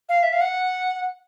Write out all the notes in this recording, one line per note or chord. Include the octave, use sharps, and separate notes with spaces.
F5
E5
F5
F#5